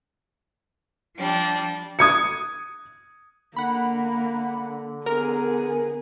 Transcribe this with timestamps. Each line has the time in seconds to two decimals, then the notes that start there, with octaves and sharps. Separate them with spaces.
1.16 F3 G3 D4
1.99 D#6 G#6 C#7
3.56 D3 A#3 F#5 B5
5.06 B3 G#4 A#4